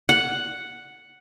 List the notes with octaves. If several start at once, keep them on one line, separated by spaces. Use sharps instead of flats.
F#5